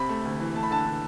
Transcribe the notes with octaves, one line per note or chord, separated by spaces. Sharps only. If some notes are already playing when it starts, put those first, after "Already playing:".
Already playing: C3 B5
A3
D2
E3
A3 A5
B5
D3 A5
D3